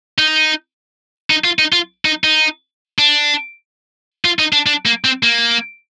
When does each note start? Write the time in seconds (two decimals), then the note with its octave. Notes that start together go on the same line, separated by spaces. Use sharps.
0.18 D#4
1.30 D#4
1.44 F4
1.59 D#4
1.73 F4
2.05 D#4
2.24 D#4
2.99 D4
4.25 F4
4.39 D#4
4.53 D4
4.66 D4
4.86 A#3
5.05 C4
5.23 A#3